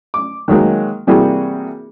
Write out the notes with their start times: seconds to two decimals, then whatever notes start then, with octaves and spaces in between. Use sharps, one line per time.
0.14 D6
0.48 D#3 F#3 G#3 A#3
1.07 C3 E3 G3 A#3 F#4 G#4